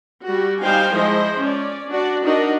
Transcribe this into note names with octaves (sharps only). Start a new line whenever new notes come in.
G3 F#4
G3 D#4 C5 F5 G5 G#5
F3 G#3 E4 C5 D#5
C#4 D5
D4 F#4 D5
D4 D#4 F#4 A#4 D#5